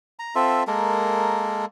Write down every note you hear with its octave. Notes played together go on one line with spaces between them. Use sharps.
A#5
C4 F4 A4 E5
G#3 A#3 A4 A#4